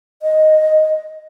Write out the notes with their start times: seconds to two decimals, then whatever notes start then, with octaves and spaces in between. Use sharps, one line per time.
0.22 D#5